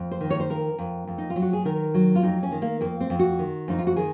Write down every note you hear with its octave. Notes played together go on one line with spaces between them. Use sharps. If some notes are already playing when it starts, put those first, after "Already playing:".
Already playing: F2
C5
D#3
C#5
C5
F2 A#4
F2
F2
D#4
F4
F#3
F#4
G#4
D#3 A#4
F#3
F4
F2 D#4
C#4
D#3
A#3
F2 A#3
C4
F2
F#4
D#3
F2 D#4
F4
F#4
D#3 G#4